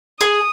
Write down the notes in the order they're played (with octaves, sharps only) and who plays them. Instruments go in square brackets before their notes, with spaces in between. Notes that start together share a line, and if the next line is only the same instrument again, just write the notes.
[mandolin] G#4 [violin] D#6